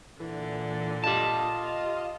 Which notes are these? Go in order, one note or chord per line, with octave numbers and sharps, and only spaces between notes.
A#2 D3 E3
F4 G4 D#5 A5